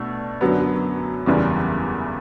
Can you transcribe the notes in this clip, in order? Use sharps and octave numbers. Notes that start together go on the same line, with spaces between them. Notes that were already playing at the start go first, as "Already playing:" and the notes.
Already playing: B2 A3 D4
F#2 D3 F#3 B3
F#1 E2 C#3 E3 G3